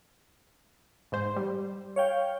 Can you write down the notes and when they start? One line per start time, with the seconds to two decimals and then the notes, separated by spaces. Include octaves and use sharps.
1.12 G#2 C5
1.36 G3
1.96 C#5 F5 G5